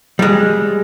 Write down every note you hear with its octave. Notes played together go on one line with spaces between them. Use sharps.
G3 G#3